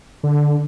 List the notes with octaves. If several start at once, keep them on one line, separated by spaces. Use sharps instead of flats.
D3